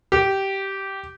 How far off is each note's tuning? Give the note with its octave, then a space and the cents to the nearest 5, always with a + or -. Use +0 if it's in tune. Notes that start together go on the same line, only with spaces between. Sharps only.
G4 -15